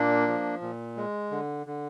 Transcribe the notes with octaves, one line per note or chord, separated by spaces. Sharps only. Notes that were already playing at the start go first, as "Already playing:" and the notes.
Already playing: A#2 A#3 D4
F3
A#2
G#3
D3
D3